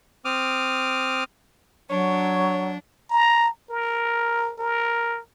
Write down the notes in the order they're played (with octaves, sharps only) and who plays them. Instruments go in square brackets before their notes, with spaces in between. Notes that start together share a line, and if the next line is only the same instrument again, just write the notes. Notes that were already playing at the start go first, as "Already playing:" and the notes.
[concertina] C4 D6 D#6 F6
[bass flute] F#3 [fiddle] D4 [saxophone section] C#5
[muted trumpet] A#5
A#4
A#4